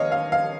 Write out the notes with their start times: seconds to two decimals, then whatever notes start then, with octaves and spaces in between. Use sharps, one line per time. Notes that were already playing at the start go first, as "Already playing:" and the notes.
Already playing: D#2 C#5 D#5 F5
0.12 F5
0.32 F5